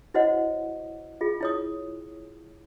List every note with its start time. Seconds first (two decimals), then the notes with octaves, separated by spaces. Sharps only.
0.14 E4 F#4 C5 C#5 D#5 F#5
1.21 F4 G#4
1.41 E4 C#5 D#6